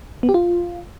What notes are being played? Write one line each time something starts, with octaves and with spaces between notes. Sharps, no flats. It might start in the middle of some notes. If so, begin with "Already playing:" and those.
B3
G4
F4